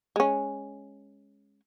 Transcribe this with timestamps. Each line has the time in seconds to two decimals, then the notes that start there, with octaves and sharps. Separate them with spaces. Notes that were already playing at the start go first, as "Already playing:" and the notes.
0.16 G#3 C#4